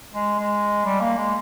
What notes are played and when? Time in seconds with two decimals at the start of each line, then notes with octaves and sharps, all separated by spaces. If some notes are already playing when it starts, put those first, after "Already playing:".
0.14 G#3
0.39 G#3
0.85 G3
1.01 A#3
1.17 G#3